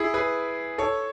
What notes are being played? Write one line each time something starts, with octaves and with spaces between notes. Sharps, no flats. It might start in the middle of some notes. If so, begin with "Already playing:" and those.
Already playing: E4 G#4
G#4 B4
A4 C#5